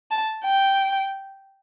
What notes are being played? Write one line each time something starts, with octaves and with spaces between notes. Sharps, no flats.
A5
G5